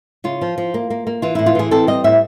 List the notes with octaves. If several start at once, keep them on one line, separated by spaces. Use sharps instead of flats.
C#3 F4
F3
F3
A#3
A#3
A#3
E3 F4
A2 E4
F4
E3 G#4
C4 A4
G3 D#5
A2 E5